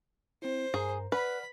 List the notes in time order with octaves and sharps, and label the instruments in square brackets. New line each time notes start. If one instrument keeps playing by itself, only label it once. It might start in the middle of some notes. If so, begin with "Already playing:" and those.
[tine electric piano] C4 E4 [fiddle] C5
[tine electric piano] G2 A#4 A#5 [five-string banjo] G#4
[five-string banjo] B4 [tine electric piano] D5 F#5 F6 [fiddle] B5